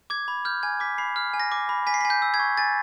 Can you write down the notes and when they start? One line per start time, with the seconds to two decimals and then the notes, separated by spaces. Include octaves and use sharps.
0.10 D6 G#6
0.28 B5
0.45 F6 G6
0.63 G#5 G#6
0.80 D6 B6
0.98 B5 C7
1.16 F6
1.33 G#5
1.40 A#6
1.52 D6
1.69 B5
1.87 G#5 B6
1.94 C7
2.01 B6
2.05 G#5
2.10 G6
2.22 E6
2.34 G#6
2.39 C#6
2.57 G#5 A6